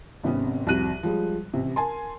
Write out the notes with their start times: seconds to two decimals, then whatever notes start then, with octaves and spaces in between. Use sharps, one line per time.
0.24 G#1 C3 B3 C#4
0.67 C2 F2 F#4 F#6 D#7
1.03 F3 G3 G#3
1.54 A1 C3
1.76 A#4 G#5 A5 C6